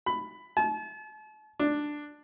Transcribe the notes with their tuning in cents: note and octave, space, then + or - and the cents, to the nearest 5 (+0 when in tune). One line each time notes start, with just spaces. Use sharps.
B5 +10
A5 -40
D4 +5